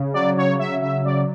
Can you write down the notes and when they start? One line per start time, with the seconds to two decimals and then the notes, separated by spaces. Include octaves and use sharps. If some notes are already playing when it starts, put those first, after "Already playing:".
Already playing: C#3
0.14 F#3 D5
0.37 C#3 C#5
0.59 F#3 E5
0.82 C#3 E5
1.05 F#3 D5